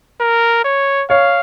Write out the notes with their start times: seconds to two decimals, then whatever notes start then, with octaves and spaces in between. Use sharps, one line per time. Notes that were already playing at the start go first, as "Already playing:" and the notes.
0.20 A#4
0.64 C#5
1.09 C#5 F5